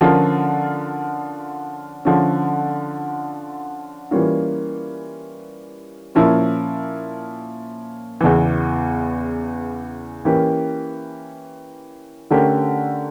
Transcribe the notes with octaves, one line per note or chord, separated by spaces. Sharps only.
D3 F3 C#4 F4 A#4
D3 F3 C#4
E3 G3 A#3 C#4 F4
A#2 F3 C#4 E4 A#4
E2 C#3 E3
E3 A#3 C#4 G4 A#4
D3 A3 C#4 G4 A#4